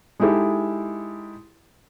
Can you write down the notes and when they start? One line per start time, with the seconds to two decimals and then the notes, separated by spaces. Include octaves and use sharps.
0.20 G#3 D#4 E4 G4 A4